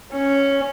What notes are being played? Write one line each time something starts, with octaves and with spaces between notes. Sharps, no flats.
C#4